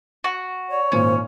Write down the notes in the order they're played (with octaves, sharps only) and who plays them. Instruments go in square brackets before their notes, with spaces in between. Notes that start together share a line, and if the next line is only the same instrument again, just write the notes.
[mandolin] F#4
[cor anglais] C#5 [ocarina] D5
[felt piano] G#1 A#2 [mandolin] C#4 [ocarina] C5